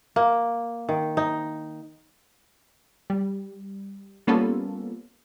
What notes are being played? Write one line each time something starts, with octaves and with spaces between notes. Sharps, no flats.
A#3
D#3
D#4
G3
G3 A#3 B3 C#4 F4 A4